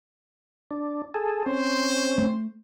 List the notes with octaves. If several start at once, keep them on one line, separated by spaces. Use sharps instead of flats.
D4
G#4 A4
C4 C#4 C5
A3